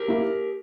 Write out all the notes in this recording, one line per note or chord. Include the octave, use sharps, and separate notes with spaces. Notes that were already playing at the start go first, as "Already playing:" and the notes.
Already playing: G4 A#4
A#3 E4